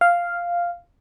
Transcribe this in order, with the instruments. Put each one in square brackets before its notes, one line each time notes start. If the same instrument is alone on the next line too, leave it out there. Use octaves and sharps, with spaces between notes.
[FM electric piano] F5